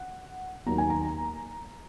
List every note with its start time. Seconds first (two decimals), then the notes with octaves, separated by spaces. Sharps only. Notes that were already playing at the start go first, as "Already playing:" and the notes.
Already playing: F#5
0.66 D#2 D#3 F#3 A#3 A#5
0.78 G#5
0.90 A#5